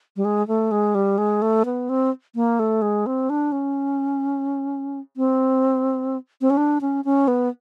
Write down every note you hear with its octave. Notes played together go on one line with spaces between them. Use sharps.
G3
G#3
A3
G#3
G3
G#3
A3
B3
C4
A#3
A3
G#3
C4
D4
C#4
C4
C4
C#4
D4
C#4
C#4
B3